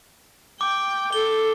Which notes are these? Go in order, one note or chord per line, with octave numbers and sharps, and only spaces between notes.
G5 D6
A4 G7